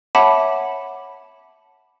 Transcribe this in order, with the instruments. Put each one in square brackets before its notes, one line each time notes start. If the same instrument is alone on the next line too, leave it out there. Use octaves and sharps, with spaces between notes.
[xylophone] C#5 E5 F#5 A5 B5 D6